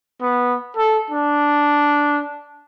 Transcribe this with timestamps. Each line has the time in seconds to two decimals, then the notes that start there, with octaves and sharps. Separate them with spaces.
0.21 B3
0.77 A4
1.10 D4